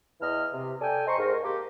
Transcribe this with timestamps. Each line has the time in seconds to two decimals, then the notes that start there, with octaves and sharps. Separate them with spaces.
0.21 E2 E3 D#5 F6
0.53 C3
0.82 A4 D5 G5 G#5
1.07 C5 D#5 A#5 C6 C#6
1.18 G#2 A#4
1.43 A#3 G4